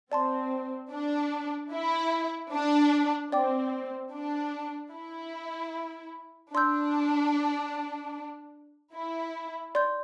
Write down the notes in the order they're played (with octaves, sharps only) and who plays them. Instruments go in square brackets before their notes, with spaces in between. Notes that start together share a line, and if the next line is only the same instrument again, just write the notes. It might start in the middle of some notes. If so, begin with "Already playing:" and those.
[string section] C4 [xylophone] D5 A5 C6
[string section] D4
E4
D4
[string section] C4 [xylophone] D5 G5 D6
[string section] D4
E4
[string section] D4 [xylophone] D5 C6 E6 G6
[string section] E4
[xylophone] D5 C6 G6